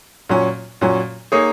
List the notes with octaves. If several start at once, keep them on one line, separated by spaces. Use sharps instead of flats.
A#2 F#3 C#4
A#2 F#3 C#4
A#3 D#4 G#4 C#5